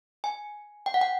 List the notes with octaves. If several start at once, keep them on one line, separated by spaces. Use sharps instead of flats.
G#5
G5
F#5
G5